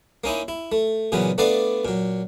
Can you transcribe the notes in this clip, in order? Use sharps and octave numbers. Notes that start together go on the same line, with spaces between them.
A#3 C#4 D#4 E4
E4
A3
A#2 C#3 E3 F#3 B3
A3 B3 D4 B4 D5 F5
A#2 F#3